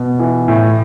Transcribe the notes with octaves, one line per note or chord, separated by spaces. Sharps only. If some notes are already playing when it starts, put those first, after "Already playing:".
Already playing: B2
E3
A2